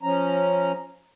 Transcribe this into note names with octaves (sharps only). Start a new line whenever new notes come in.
F3 C#4 A#5